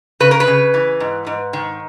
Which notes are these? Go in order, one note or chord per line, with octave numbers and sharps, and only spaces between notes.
C#3 B4
A#4
B4
C#3
E3
G#2
G#2
D#3